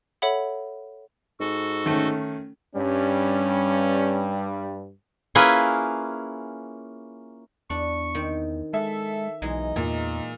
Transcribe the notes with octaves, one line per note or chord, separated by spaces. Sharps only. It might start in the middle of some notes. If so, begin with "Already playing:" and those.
A4 C#5 E5 F#5 B5
G#2 F#4 A4
D#3 A3 C#4
G2 G3 C#4
A#3 C#4 E4 F4 G#4 B4
E2 D4 C#6
D#3 C4
G#3 A4 E5
B1 E3 G#3 D#4
E2 A#2